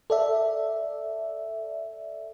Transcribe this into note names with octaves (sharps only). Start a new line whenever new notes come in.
A4 D5 E5